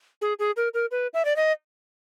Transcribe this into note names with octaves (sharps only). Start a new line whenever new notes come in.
G#4
G#4
A#4
A#4
B4
E5
D5
D#5